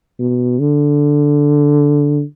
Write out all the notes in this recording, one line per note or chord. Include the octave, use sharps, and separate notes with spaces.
B2
D3